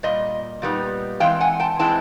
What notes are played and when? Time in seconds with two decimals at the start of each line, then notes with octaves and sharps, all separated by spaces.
0.03 A#2 G3 D#5
0.62 A#2 G3 B3 D#4
1.20 E3 G#3 C4 F5 G5
1.40 F#5 G#5
1.60 G5 A5
1.79 E3 G#3 C4 E4 G5 A5